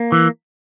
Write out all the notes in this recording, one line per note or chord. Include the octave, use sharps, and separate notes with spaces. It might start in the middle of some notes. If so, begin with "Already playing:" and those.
Already playing: A#3
E3